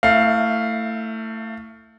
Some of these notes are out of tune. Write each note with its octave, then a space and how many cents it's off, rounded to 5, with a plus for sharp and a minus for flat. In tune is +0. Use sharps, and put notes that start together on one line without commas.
A3 +20 E4 +0 F5 +0